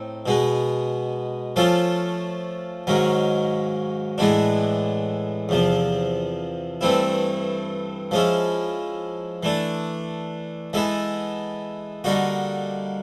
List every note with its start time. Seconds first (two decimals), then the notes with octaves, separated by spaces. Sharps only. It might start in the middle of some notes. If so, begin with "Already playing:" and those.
Already playing: A2 C4 D#4
0.26 B2 G#3 B3
1.56 F3 A3 C#4 F4 A4
2.87 G#2 D#3 F#3 A#3 C#4
4.18 A2 E3 G#3 B3 D4
5.49 E2 C3 F3
6.81 G2 E3 A3 C4 E4
8.11 F3 G#3 C#4 E4
9.43 E3 A3 D4
10.73 E3 G#3 B3 E4 A4
12.04 D3 G3 A#3 D#4 F#4